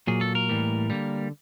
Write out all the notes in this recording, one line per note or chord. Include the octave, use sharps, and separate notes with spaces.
A#2 F#3 A#3 G#4
A4
A#4
A2 E3 G3 A#3
D3 G3 A#3